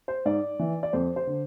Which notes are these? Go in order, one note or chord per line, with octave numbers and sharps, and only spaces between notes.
C5
G#2 D5
E3
D5
F2 C5
C5
D3